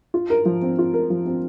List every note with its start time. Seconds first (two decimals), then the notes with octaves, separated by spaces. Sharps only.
0.14 F4
0.30 A#4
0.45 F3
0.62 C4
0.79 F4
0.94 A#4
1.10 F3
1.27 C4